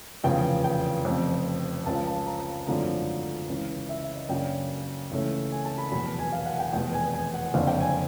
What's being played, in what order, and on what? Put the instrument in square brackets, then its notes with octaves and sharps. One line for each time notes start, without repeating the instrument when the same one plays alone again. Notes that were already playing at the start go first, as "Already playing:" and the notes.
[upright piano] F1 E2 C#3 F3 G5
G5
F1 F2 C#3
C#2 C#3 F3 A5
A5
A#5
G#1 F#2 D3 F3 A3 A#5
C#2 C#3 E3
E5
E5
D#5
F#2 C#3 F#3 A#3 D4 G5
C#2 C#3 E3 A3 C#4
G#5
A5
B5
F1 E2 B2 F#3 B5
A5
G#5
F5
F#5
G5
F1 E2 B2 G5
G#5
G#5
F#5
F#1 F2 D3 F5
G5
G#5